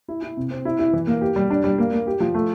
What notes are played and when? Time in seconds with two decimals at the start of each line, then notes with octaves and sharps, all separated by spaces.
0.08 E4
0.22 E4
0.37 C3
0.51 C4
0.65 E4
0.79 E4
0.93 E3
1.07 A#3
1.21 G4
1.36 G3
1.50 D4
1.64 G3
1.78 A#3
1.93 A#3
2.07 G4
2.20 F3
2.34 A3